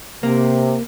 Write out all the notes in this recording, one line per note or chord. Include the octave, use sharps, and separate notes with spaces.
C3 A#3